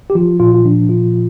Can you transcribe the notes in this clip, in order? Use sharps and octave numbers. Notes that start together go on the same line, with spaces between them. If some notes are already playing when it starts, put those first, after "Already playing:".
G4
F3 F4
A#2 F4
F4
F3 D4
A#2 F4